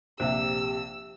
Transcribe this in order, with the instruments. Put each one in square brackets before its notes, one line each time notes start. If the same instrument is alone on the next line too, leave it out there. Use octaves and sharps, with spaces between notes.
[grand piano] A#1 C3 [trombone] G4 [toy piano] C5 E5 [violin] E6